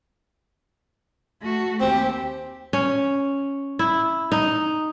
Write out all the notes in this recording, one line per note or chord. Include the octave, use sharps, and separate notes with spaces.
A3 F#4
D#2 C4 G4
C#4
E4
D#4